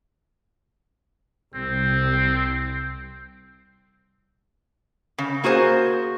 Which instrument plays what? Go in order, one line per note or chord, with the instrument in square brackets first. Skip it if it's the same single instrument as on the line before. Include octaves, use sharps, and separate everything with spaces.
[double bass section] C2 [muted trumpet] C4
[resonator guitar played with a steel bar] C#3
A#3 F#4 G#4 C5